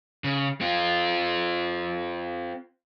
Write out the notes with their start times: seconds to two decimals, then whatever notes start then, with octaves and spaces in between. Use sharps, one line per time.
0.24 C#3
0.61 C4 F4